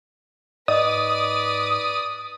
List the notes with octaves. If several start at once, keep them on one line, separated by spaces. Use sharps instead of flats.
G#2 B4 D5 D#5 D#6